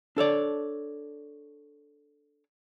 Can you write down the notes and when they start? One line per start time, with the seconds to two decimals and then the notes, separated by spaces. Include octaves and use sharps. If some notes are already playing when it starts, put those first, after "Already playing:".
0.17 D4 A4 C#5 D5